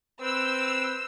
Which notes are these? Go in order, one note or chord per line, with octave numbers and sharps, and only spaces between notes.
C4 B4 E6